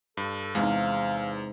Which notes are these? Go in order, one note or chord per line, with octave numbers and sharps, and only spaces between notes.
G2 A4
E2 G#2 C3 D#4 F5